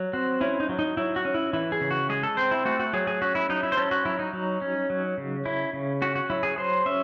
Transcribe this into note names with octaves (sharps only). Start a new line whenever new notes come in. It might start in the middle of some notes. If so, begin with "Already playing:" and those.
Already playing: F#3
C4 F#4
C#4 E4
D#4
F#3
D#4
F#3 E4
F#4
C#4
E4
E3 E4
G#4
C#3
F#4
G#3 G#4
A4
C4 C5
E4
A3 F#4
F#4
F#3 G#4
G#4
C#4 F#4
E4
F#3 D#4
E4
C5
C#4 A4
F#4
F#3 E4
D#4
F#3
C#4
F#3
C#3
C#4 E4
C#3
C#4 F#4
F#4
F#3 E4
G#4
F#3 C5
C#4 E5